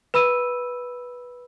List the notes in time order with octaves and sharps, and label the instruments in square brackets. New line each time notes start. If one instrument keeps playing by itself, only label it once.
[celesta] B4 B5 E6 D#7